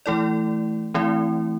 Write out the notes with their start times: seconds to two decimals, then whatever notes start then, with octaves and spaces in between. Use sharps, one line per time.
0.06 E3 A3 E4 A4 D5
0.94 E3 A3 C4 E4